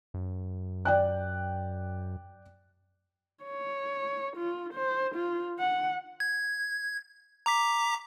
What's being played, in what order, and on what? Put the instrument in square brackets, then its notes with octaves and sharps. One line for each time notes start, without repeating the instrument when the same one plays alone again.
[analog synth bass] F#2
[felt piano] D5 G5 F#6
[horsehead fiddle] C#5
F4
C5
F4
F#5
[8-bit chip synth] G#6
A#5 D6 B6